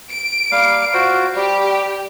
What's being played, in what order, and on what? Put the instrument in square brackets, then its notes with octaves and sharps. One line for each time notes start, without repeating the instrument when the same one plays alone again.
[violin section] D7
[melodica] G3 A#3 F5
F4 F#4 C5
[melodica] G3 [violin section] G4